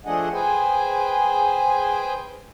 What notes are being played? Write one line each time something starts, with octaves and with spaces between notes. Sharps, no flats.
F3 A3 D4 G#4 D#5 F#5
G#4 B4 C5 G5 G#5